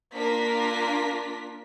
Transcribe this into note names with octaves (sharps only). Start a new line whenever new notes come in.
A#3 D4 F4 A#4 B6